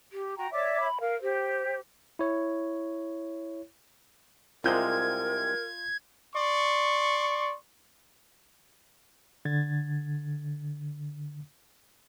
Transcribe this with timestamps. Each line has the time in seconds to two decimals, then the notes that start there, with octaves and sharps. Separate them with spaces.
0.12 G4
0.37 F#4 G5 A#5
0.52 C#5 D5 E5 D6
0.80 B5
1.00 A#4 F5
1.22 G4 C5
2.19 E4 C#5
4.64 C2 C3 G#3 F4 A#4 G6 G#6
6.35 D5 C6 C#6
9.45 D3 G#6 A6